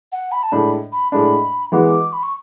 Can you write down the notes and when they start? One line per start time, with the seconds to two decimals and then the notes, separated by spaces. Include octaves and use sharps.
0.12 F#5
0.32 B5
0.43 A5
0.52 A2 G#3 D4 B5
0.92 B5
1.12 A2 G#3 D4 B5
1.72 E3 G#3 B3 F#4 D6
2.13 B5
2.23 C#6